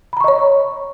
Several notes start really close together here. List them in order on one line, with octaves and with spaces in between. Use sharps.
B5 A#5 C#6 D#5 C#5